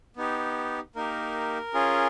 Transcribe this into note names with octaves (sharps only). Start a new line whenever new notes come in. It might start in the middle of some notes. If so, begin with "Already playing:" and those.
B3 D#4 G4
A#3 D#4 G4 A#4
C#4 F4 G#4